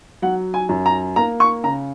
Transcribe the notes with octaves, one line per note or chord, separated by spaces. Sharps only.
F#3 F#5
G#5
F#2
A#5
A#3 A#5
C#6
C#3 A#5